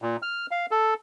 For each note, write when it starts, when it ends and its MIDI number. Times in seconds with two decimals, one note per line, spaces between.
0.02 0.17 46
0.22 0.46 89
0.51 0.66 77
0.71 0.94 69